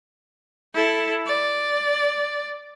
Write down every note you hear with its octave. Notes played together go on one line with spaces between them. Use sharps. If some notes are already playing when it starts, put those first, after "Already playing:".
E4 A4
D5